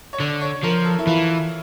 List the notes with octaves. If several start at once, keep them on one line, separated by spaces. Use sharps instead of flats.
C#5
D3 D5
C#5
F3 A#4
A4
E4
E3 F4